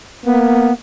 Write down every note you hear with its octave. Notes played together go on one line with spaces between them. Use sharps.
A#3 B3